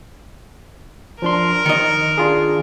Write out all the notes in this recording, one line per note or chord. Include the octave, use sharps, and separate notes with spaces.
F3 D4 A#4 C6
D#3 D#5 C#7
D4 F4 G#4